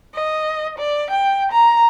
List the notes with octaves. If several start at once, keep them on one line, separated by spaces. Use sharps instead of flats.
D#5
D5
G5
A#5